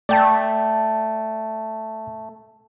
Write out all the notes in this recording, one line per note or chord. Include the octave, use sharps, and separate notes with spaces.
A3 D5 G5 A5